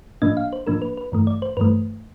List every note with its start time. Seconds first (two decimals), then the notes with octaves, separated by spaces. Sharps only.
0.22 A2 F3 A#3 D4 D#5
0.37 F5
0.53 C5
0.67 A2 F3 A#3 D4 A#4
0.82 B4
0.97 B4
1.12 G2 E3 A3
1.27 D5
1.42 C5
1.57 G2 E3 A3 B4